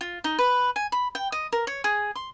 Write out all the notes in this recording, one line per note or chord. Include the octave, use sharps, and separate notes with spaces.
F4
D#4
B4
G#5
B5
G5
D#5
A#4
C#5
G#4
C6